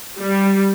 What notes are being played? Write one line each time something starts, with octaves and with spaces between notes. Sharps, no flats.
G3